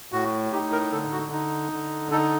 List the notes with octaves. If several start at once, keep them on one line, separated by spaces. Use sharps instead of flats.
A2 F#4
D#4 G4
A#4
D3 A4
F#4
D#4
D3
D#4 A4